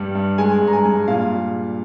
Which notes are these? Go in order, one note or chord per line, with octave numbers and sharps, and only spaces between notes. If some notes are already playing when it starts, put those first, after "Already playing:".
Already playing: G2 G3
G2
G#3 G#5
G2
A#5
G#5
G2
A#2 F5